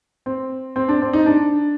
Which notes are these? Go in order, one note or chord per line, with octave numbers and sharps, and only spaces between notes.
C4
C4
D4
C4
D#4
D4